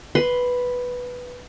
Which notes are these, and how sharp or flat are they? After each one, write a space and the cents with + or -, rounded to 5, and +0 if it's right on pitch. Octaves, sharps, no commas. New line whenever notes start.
B4 +0 C6 +0